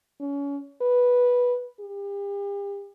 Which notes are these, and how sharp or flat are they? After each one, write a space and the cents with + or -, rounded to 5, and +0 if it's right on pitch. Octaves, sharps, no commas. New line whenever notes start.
C#4 +30
B4 -10
G4 +40